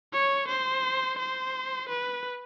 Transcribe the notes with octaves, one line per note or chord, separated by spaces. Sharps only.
C#5
C5
C5
B4